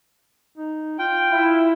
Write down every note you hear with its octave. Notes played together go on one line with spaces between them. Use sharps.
D#4
F4 G5
E4